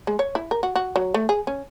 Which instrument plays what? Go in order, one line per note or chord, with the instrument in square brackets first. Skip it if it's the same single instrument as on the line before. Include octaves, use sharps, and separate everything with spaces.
[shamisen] G#3
C#5
E4
A#4
F#4
F#4
F#3
A3
G#4
C#4